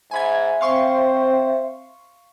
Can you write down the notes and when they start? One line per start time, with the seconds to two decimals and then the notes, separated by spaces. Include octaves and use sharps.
0.11 G#2 E5 G#5 B5 G#6
0.61 C4 C5 F5 C6 C#6